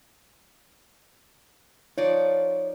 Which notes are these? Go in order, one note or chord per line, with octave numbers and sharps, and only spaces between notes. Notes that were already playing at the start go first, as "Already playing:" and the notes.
F3 D#4 C#5 D5